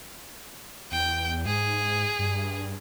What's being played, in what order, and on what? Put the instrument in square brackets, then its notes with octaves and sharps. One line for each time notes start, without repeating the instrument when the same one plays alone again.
[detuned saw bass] E2 [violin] G5
[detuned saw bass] G#2 [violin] G#4
[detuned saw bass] G2